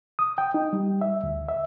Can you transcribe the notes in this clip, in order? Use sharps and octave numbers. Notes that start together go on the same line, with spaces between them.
D#6
G5
D#4
G3
E5
D2
E5